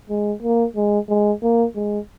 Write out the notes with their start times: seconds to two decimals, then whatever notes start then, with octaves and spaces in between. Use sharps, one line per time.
0.10 G#3
0.42 A#3
0.76 G#3
1.09 G#3
1.42 A#3
1.76 G#3